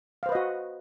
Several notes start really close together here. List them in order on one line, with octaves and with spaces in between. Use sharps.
F5 C5 B4 D#5 F#4